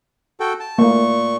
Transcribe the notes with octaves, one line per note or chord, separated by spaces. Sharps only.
F#4 A4 G5
A5
A#2 A3 A#3 C#6